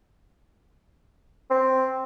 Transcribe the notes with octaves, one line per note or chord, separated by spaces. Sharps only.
C4